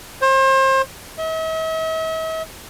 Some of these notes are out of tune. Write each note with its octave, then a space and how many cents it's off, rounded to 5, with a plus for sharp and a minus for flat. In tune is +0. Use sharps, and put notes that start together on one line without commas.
C5 +35
E5 -45